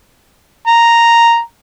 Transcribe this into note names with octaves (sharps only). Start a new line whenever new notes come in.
A#5